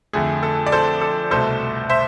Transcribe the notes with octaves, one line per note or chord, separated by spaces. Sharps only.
F2 D3 A3 G#4
A4
D5
A4 C5
A4
C2 B2 A3 A4 C5
C5 E5